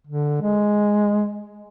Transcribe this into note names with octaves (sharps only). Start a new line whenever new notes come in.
D3
G#3